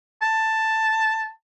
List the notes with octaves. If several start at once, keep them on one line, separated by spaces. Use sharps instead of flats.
A5